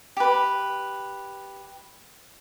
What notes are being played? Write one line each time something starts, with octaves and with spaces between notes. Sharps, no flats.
G4 B4